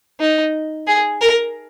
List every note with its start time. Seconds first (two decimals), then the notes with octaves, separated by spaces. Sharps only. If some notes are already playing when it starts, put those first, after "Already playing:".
0.20 D#4
0.88 G#4
1.21 A#4